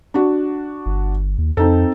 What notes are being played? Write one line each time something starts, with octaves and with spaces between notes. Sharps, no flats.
D4 F#4
G1
D#2
F2 C4 D#4 A4